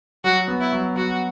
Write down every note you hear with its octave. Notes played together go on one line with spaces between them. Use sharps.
F#3 F#4
B3
E4
F#3
F#3 F#4